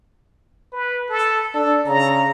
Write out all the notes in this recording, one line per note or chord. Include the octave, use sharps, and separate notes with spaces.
B4
A4
D4 A4
C#3 A#5